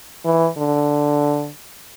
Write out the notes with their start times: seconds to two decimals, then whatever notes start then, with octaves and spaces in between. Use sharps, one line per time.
0.25 E3
0.58 D3